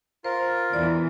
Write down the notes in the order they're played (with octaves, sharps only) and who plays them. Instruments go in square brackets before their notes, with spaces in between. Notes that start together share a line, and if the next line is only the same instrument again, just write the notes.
[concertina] F4 A#4 [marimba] C5
[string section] E2 E3 [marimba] D5